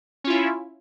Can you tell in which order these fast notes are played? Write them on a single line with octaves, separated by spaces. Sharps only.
C#4 F4 E4